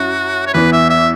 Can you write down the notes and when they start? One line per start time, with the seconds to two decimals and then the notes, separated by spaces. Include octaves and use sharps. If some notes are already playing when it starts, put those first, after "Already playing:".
Already playing: F#2 F#3 E4 F#4
0.47 C#5
0.54 E2 E3 B3 B4
0.72 E5
0.90 E5